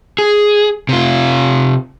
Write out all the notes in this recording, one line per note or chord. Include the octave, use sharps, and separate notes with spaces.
G#4
C3 F4